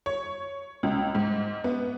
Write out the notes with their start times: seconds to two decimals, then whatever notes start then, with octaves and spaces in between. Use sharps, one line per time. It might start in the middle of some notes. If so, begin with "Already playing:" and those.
0.06 C#5
0.83 C#2
1.15 G#2
1.64 B3